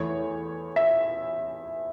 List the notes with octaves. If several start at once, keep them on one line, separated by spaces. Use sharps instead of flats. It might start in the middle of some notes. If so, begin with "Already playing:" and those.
Already playing: E2 E3 A3 C#5
E5